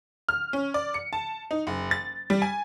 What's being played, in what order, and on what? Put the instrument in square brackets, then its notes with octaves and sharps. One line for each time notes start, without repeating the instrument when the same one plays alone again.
[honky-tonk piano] F6
C#4
D5
C#7
A5
D#4
F#1
A6
G3
G#5